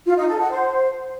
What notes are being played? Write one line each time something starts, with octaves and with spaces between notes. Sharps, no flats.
F4
D#4
A4
F#5
C5